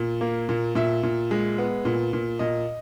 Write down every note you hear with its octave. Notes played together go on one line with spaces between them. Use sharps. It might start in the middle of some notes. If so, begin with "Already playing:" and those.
Already playing: A#2
A#3
A#2
A#2 E5
A#2
G#3
B3
A#2
A#2
A#2 D#5